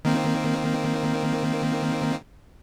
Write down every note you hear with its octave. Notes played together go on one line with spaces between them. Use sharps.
D#3 A#3 C4